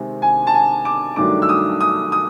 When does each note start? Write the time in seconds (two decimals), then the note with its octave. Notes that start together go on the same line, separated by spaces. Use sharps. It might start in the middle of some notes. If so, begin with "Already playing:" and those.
Already playing: C3 D#3 G#3 C4
0.22 G#5
0.47 A5
0.54 G#5
0.85 D6
1.16 G2 D#3 F#3 A3 D4 D6
1.42 E6
1.49 D#6
1.81 D#6
2.12 D#6